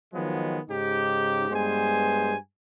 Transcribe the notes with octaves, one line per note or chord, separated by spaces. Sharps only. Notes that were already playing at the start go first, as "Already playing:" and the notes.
D#3 F3 F#3 G#3 B3
G#2 C#3 D#4 G4
G2 G#3 B3 C5 G#5